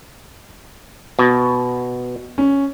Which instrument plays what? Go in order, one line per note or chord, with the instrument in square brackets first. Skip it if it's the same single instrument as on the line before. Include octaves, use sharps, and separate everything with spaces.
[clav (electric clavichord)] B2
[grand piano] C#4